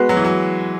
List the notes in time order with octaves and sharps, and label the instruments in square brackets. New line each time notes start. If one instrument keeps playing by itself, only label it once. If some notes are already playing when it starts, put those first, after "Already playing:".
Already playing: [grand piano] G#3 [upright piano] B3 F#4 B4
[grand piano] F#3
E3
F#3